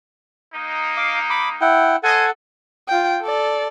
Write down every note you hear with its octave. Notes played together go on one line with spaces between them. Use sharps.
A#3 D#4
F5 D6
B5 D6
E4 F#5 G5
A4 C5 D#5 F#5 G#5
F4 G5
A4 D5